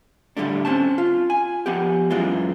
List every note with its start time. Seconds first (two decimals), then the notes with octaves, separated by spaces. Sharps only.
0.37 A2 D3 G3 A3 D4
0.65 C4 C#4 A5
0.98 F4
1.30 G#5
1.66 F3 B3 G4
2.11 F#2 E3 G#3 F4